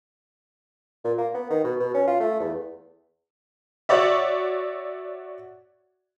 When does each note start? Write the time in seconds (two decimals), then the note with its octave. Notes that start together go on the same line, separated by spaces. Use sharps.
1.05 A#2
1.18 A#3
1.34 B3
1.50 D#3
1.64 B2
1.80 B2
1.94 C#4
2.07 F4
2.20 A3
2.40 E2
3.89 F#4 C#5 D5 E5